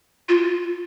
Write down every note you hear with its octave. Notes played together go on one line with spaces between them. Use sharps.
F4